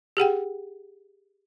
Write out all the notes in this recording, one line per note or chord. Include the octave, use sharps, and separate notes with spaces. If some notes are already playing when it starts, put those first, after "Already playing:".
G4 G#4 F#5 G5